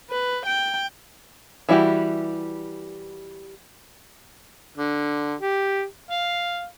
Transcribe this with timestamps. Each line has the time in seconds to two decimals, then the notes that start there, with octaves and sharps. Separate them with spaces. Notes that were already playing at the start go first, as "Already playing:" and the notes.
0.10 B4
0.46 G5
1.69 E3 G3 E4 F#4 G4
4.77 D3
5.40 G4
6.11 F5